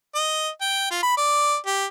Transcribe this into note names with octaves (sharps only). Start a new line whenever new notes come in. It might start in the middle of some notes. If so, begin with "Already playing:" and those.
D#5
G5
F4
B5
D5
G4